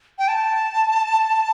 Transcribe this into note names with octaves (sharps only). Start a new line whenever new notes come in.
G5
A5